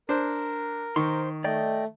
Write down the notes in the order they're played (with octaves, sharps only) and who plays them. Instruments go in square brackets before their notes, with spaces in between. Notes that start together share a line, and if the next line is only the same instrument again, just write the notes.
[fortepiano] D4 C5 [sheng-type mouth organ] A#4
[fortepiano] D#3 C#6 [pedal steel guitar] C5 C6
[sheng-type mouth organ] A3 [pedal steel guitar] D5 D#5 G5